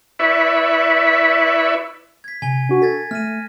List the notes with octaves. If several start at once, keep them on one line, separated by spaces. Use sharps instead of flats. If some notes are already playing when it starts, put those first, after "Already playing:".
E4 B4 D5 E5 B5 C#6
G#6 B6
C3 G#5 G7
D4 F#4
A4 G#6 A6 B6
A3 F6 A#6 D#7